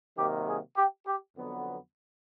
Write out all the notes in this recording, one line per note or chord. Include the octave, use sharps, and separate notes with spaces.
C3 D#3 F#3 A#3 G4
G#4
G4
G4
F2 D3 F#3 B3